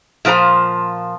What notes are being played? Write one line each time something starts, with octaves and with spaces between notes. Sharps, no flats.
A#2 F3 F4 C5 A#5